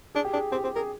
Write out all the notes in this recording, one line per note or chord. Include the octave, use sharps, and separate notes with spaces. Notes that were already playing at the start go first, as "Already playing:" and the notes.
D4 G#4
G4
D4 G#4
C4 G4
C4 G4
G#4 A#4